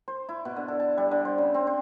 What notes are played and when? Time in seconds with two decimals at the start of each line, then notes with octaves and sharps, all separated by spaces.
0.08 C5
0.29 E4
0.45 B2
0.56 D3
0.68 A4
0.80 A5
0.97 G3
1.11 D3
1.25 C5
1.38 C#3
1.54 C4
1.67 C5